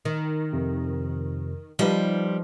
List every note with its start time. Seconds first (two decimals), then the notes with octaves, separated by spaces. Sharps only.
0.05 D#3
0.53 F2 C3
1.79 F3 G3 D#4 F4 B4